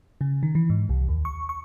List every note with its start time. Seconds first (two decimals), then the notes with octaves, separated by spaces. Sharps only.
0.21 C#3
0.43 D#3
0.55 E3
0.70 G#2
0.89 C2
1.08 D#2
1.25 C#6
1.49 C#6